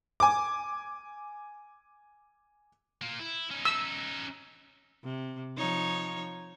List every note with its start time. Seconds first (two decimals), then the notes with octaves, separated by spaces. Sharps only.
0.20 G#5 D6
3.02 A#3 F4
3.19 E4
3.51 C#4 D#4
3.65 E6
5.04 C3
5.57 F3 D#4 C#5